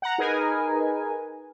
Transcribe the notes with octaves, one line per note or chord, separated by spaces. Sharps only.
F#5 A#5
D#4 G#4 A#4 B4 G#5